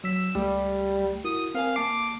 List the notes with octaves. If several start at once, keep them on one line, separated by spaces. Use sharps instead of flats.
F#3 E6 B6
C#2 G3 A3 G4
E4 F#4 A#4 D#6
C4 A#4 F5 G#5
A#3 A5 D6 C7